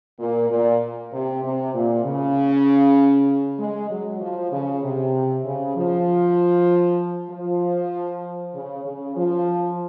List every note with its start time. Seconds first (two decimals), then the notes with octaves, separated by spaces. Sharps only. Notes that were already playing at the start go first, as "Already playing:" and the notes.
0.19 A#2
0.50 A#2
1.13 C3
1.43 C3
1.74 A#2
2.05 C#3
3.59 G#3
3.90 F#3
4.21 F3
4.52 C#3
4.83 C3
5.45 C#3
5.76 F3
7.30 F3
8.54 C#3
8.85 C#3
9.16 F3